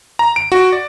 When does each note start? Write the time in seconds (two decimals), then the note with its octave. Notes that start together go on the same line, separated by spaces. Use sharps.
0.19 A#5
0.36 D7
0.52 F#4
0.72 D5